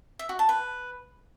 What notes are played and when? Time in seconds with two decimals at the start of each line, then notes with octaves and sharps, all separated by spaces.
0.19 E5
0.29 F#4
0.39 A5
0.49 B4